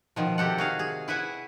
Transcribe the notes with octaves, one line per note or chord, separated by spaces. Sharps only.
B2 D#3 F3
C3 G4 A4 F#5
F#4 G#4 F5
G#4
E4 B4 E5 F#5 G#5